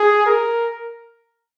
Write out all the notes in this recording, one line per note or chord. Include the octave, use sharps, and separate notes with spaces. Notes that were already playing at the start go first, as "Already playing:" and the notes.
Already playing: G#4
A#4